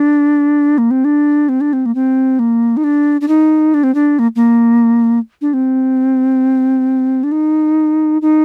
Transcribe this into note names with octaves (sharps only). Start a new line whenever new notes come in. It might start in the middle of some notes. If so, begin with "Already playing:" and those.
Already playing: D4
A#3
C4
D4
C4
D4
C4
A#3
C4
A#3
D#4
D4
D4
D#4
D4
C4
D4
A#3
A#3
D4
C4
D4
D#4
D#4